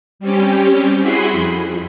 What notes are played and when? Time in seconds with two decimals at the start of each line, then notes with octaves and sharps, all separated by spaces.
0.19 G3 C4 C#4 G4
0.99 E4 F#4 G#4 B5 C6
1.32 F2